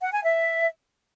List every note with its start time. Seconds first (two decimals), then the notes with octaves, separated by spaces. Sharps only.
0.01 F#5
0.12 G#5
0.24 E5